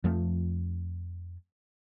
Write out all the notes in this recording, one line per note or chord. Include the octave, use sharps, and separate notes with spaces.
F2 F3 A3